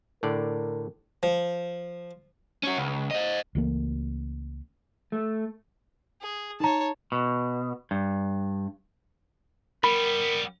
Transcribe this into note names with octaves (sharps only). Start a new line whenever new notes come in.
A2 D3 A#4 D5
F3
C#4 F#4
C#2
C5 D#5
C#2 E3 A3 A#3
A3
G#4
D#4 C#5 A5 A#5
B2
G2
G3 B3 A#4 B5